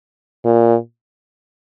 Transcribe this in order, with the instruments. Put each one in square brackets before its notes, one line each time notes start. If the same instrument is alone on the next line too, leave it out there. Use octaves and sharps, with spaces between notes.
[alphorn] A#2